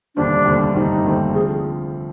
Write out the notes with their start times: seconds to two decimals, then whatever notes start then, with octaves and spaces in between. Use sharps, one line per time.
0.15 F1 D#2 D3 G3 C4 D4
0.45 F1 D#2 D3 G3 C4
0.75 F1 D#2 D3 G3 C4 D#4
1.05 F1 D#2 D3 G3 C4
1.34 D3 F3 C4 G#4